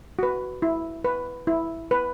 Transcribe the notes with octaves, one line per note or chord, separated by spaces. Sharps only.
F#4 B4
E4
B4
E4
B4